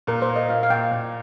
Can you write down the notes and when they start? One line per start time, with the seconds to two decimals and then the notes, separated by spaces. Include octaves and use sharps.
0.07 A#2 A#4
0.22 C5
0.28 A#3
0.36 D#5
0.49 A#2 F5
0.63 F5
0.70 A#2 G5
0.91 A#2